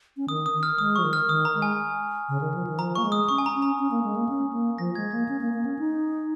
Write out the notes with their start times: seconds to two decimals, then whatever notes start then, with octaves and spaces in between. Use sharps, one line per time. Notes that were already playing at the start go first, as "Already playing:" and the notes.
0.17 C#4
0.29 D#3 D#6
0.46 D#6
0.54 D#3
0.63 F6
0.78 G#3 D#6
0.96 F3 C#6
1.04 D#3
1.13 F6
1.28 D#3 D#6
1.45 A#5
1.54 G#3
1.62 G#5
2.29 C#3
2.41 D#3
2.54 F3
2.67 D#3
2.79 F3 A#5
2.96 A#3 C#6
3.04 G#3
3.12 D#6
3.28 C#4 C#6
3.38 G#5
3.46 A#5
3.54 C#4
3.62 A#5
3.79 C#4
3.91 A#3
4.04 G#3
4.16 A#3
4.29 C#4
4.53 A#3
4.78 F3 A#6
4.95 G#3 G#6
5.12 A#3 A#6
5.29 C#4
5.41 A#3
5.53 A#3
5.65 C#4
5.79 D#4